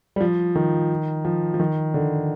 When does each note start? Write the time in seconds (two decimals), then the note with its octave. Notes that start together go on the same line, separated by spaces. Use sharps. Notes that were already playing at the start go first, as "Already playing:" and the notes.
0.16 G3
0.21 F3
0.55 D#3
1.25 F3
1.54 F3
1.60 D#3
1.94 D3